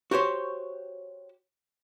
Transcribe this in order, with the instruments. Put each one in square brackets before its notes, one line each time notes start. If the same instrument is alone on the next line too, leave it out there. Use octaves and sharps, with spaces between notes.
[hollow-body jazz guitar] F#4 G4 C5 C#5